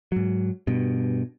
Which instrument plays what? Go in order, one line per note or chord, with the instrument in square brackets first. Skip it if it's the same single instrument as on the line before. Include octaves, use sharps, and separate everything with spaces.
[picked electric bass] G#2 F#3
G2 B2